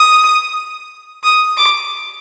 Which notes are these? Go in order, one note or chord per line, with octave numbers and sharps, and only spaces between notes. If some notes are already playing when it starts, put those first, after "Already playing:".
Already playing: D#6
D#6
D6